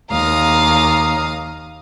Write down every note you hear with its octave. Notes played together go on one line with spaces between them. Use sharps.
D#2 F5 A#5 D#6